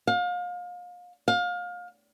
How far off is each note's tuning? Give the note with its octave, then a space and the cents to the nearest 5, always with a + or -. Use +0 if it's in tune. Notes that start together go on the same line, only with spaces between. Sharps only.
F5 +35
F5 +30